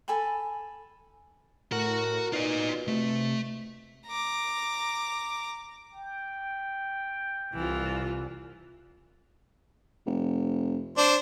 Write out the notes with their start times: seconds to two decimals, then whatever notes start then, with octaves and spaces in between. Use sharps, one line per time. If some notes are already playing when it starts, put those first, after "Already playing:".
0.08 A4 G#5 A5 B5
1.72 A2 F#4 A#4 F#5
2.33 B2 D#4 F4 D5
2.88 C3 A3
4.06 A#5 D6
5.93 G5
7.54 C2 E3 F4
10.06 F1
10.97 D4 C5